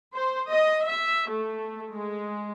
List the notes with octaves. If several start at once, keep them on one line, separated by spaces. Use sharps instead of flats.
C5
D#5
E5
A3
G#3